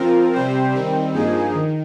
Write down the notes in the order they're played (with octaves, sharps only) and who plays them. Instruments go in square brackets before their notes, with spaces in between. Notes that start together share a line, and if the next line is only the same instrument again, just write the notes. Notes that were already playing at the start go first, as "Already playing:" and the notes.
Already playing: [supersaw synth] F3 C4 F4 A#4
C3 G3 C4 G4 C5
D#3 G3 C4
G2 F3 A#3 D#4 G#4
D#3